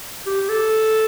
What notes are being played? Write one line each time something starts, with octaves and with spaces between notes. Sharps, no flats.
G4
A4